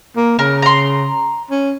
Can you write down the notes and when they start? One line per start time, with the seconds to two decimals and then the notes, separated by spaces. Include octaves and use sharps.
0.16 A#3
0.39 C#3 A#4
0.62 A#5 C6
1.51 C#4